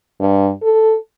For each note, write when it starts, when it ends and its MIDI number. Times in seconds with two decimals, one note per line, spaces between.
0.20 0.50 43
0.63 0.96 69